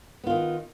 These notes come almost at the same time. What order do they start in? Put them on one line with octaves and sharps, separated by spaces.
B3 F4 D#3